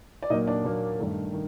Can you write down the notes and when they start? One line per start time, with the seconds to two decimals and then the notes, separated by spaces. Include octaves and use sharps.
0.22 D5
0.30 A#2 F#3 A#3 D#4 D#5
0.47 D4 D5
0.64 A#2 F#3 A#3
0.99 G2 D#3 A3
1.33 D#3